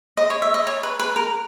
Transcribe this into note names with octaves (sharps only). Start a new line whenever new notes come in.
D#5
C#5
E5
D#5
C#5
B4
B4
A#4